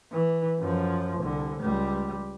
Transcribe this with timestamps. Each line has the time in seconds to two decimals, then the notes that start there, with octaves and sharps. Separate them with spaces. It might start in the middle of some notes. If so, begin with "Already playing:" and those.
0.12 E3
0.59 F#2 F3
1.19 C2 D3
1.61 C#2 G3